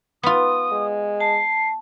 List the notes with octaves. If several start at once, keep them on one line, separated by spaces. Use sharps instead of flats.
B3 F4 D#6
G#3
A5 C7